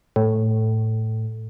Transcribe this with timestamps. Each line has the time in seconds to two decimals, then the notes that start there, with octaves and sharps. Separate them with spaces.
0.16 A2